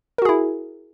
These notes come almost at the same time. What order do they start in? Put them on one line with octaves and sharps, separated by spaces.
A#4 F#4 G#4 E4